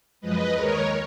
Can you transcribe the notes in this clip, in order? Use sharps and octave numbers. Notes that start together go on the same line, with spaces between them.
F#2 F3 G#3 B4 D#5
D#2 D#3 G#3 A#4 C#5